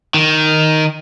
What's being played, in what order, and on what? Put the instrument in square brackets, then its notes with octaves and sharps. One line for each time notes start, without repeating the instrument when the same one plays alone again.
[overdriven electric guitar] D#3